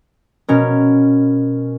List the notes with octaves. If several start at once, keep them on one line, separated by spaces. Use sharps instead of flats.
B2 C#4 A#4